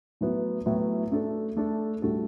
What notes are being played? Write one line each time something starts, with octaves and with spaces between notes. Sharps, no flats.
A2 F#3 B3 E4
A2 F#3 B3 E4
A3 D4 A4
A3 D4 A4
A2 G3 D4 F#4 A4